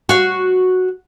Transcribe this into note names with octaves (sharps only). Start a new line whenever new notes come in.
F#4 F5